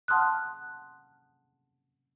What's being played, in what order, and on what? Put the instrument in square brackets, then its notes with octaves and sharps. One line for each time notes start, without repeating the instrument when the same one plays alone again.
[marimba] F#5 A5 C6 D#6 F6 F#6